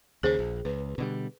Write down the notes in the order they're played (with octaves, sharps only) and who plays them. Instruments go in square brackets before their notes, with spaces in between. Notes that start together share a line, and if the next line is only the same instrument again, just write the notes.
[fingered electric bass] D#2 C#3 [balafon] G#4 C5
[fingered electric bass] A#1
[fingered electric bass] C#2 [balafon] B4
[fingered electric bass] B2 D3 G3